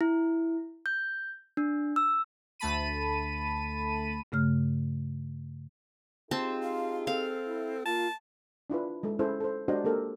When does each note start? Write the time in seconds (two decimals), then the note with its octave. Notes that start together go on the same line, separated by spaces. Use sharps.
0.01 E4
0.86 G6
1.57 D4
1.96 E6
2.59 D2 A3 A5 B5 D#7
4.32 G2 C#3 A3 F6
6.31 C4 D#4 F4 G4 G#4 A5
6.63 F5
7.07 C4 A4 F5
7.46 E4
7.86 A#3 F4 A5
8.70 D4 E4 F4 B4
9.03 G#3 A3 A4
9.19 C#4 E4 G#4 A4 C5
9.40 A4 C5
9.68 G#3 D4 F#4 G4 C5 D#5
9.84 A#3 G4 A4 A#4